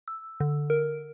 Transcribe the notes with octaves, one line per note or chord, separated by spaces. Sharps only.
E6
D3
A#4